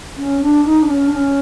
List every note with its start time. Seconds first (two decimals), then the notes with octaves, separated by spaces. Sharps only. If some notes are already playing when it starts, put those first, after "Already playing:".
0.17 C#4
0.41 D4
0.64 D#4
0.82 D4
0.88 C#4
1.08 D4
1.12 C#4